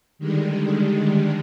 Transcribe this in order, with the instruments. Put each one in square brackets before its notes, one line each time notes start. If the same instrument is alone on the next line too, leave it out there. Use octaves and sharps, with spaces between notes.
[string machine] D3 D#3 G3 G#3